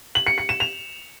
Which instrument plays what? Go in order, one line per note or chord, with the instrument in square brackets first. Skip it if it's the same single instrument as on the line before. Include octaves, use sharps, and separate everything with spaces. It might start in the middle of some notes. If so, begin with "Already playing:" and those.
[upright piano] F#7
C#7
C#7
E7
F7